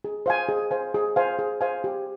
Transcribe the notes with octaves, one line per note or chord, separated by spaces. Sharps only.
G#4
C5 F5 G#5
G#4
C5 F5 G#5
G#4
C5 F5 G#5
G#4
C5 F5 G#5
G4